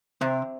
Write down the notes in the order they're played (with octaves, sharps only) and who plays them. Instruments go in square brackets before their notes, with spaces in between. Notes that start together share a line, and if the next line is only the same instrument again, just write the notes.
[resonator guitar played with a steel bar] C3 [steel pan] C4